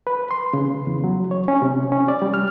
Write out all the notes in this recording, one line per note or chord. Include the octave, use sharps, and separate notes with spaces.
B4
C6
C#3
E2
F#3
C#5
C#4
C3
C#4
D5
G3
F6